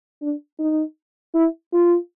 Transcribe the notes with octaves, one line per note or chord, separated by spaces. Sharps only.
D4
D#4
E4
F4